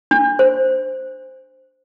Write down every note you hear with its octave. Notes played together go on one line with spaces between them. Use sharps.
D4
C5